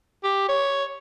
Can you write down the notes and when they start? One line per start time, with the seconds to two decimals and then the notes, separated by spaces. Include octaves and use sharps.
0.24 G4
0.49 C#5